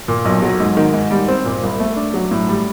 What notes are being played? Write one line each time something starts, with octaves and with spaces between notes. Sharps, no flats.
A#2
B1
F#3
G#2
D#3
G#2
G3
C4
A#2
C2
A3
D4
F#3
A2
G3